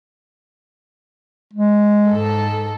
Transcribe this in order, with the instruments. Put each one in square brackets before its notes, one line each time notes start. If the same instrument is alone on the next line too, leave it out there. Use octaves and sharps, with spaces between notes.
[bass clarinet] G#3
[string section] G#2 A4